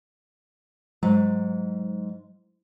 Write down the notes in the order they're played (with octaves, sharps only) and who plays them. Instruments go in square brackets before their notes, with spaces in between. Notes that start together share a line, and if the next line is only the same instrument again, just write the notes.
[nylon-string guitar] G#2 [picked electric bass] F#3